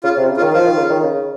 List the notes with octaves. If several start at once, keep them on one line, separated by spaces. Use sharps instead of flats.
C#3 F4
C3
C#3
F4
D#3
F3 F4
D#3
C#3
D#3
C#3